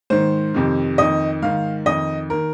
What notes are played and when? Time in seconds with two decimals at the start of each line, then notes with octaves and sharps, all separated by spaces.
0.10 G#2 D#3 C5
0.54 F2 C3 D#3
0.98 F2 D#3 D#5
1.42 G#2 D#3 F5
1.86 F2 D#3 D#5
2.30 D#3 A#4